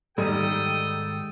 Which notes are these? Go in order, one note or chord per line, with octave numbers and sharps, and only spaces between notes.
G#2 D#3 G3 A4 G5 D#6